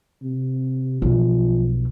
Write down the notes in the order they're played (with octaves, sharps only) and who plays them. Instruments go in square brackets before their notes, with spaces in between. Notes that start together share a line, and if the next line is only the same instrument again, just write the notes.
[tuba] C3
[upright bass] B1 [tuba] F3